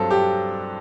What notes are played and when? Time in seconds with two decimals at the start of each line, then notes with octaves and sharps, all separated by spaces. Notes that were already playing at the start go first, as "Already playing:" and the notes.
Already playing: G2 F#3 C4 A4
0.11 G4